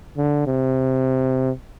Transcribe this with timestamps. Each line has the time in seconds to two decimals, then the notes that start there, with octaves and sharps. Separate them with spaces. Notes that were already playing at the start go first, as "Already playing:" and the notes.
0.17 D3
0.46 C3